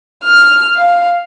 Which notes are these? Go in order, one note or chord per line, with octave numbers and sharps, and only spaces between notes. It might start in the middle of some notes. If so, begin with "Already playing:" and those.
F6
F5